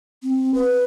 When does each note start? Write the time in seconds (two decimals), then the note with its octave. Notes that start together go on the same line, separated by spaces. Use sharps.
0.23 C4
0.54 B4